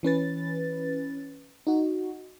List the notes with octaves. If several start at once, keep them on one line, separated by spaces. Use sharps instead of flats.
E3 C#4 B4 A6
D#4 F#4